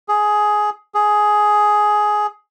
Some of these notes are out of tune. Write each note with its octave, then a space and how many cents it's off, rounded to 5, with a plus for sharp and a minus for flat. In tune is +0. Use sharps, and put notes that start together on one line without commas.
G#4 +10
G#4 +10